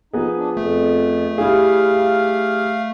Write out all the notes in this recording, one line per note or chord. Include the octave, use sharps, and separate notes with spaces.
F3 B3 D#4 G#4
D4
F2 A3
G3 E4 G#4 F5